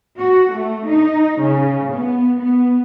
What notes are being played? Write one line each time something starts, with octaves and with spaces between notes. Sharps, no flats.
F#4
A3
D#4
C#3
B3
B3